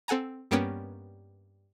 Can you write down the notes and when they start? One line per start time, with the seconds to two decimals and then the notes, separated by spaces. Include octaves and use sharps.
0.08 C4 A4 F#5 G#5 A#5
0.51 G2 G3 A#3 B3 C#4 G5